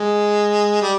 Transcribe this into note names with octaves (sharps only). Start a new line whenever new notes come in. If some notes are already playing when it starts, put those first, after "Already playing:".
Already playing: G#3
G3